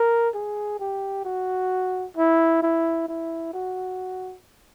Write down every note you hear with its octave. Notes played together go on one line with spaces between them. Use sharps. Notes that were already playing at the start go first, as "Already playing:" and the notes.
Already playing: A#4
G#4
G4
F#4
E4
E4
E4
F#4